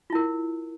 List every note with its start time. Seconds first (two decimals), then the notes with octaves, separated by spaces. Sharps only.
0.10 F4
0.13 E4
0.15 A#4